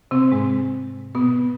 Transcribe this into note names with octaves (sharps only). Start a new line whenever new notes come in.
C3 C4
G#2 G#3
B2 B3